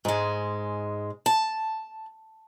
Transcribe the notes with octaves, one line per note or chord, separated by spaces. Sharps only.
G#2 G#3
A5